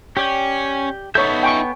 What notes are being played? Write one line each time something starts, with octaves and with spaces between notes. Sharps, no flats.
C#4 G4 D5 G5
B3 D#4 A4 C#5 E5 A5 G6
G5 G#5 C#6